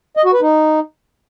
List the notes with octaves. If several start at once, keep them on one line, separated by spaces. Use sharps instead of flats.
D#5
F#4
B4
D#4